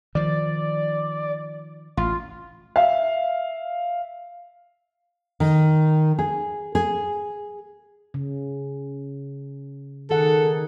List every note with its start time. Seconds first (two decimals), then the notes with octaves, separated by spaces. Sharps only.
0.15 D#3 F3 D5
1.97 A1 F4
2.76 E5 F5
5.40 D#3
6.19 G#4
6.75 G#4
8.14 C#3
10.10 D#3 G#4 A4 F#5